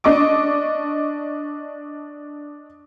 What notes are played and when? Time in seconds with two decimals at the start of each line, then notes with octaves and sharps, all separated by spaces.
0.04 D4 D#5 C#6 D6